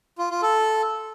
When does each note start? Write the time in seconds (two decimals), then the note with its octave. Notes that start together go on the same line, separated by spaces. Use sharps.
0.19 F4
0.30 F4
0.42 A4